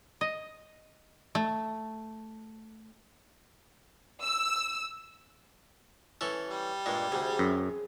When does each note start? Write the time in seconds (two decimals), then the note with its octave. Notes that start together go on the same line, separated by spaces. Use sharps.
0.21 D#5
1.35 A3
4.23 E6
6.21 E3 C#4 A4
6.50 G3
6.86 G2 A#2 G#3
7.12 D2 C3 G#4
7.39 F#2